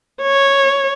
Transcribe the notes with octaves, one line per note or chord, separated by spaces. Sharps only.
C#5